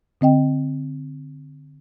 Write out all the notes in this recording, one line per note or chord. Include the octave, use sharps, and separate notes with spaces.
D3 C4 D#5 G5